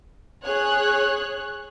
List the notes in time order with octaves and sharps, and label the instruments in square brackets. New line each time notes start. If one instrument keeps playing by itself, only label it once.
[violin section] G#4 C#5 F#6